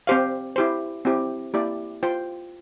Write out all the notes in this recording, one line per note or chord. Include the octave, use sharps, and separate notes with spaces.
C4 G4 C5 F5
E4 G4 C5
C4 E4 G4
A#3 E4 G4 D5
F4 C5 G5